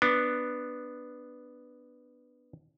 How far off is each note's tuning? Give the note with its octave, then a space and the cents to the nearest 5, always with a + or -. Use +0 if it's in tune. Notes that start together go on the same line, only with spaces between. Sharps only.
B3 +0 D4 +10